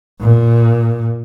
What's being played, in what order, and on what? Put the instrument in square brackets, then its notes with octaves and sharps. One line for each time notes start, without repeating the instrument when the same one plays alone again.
[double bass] A#2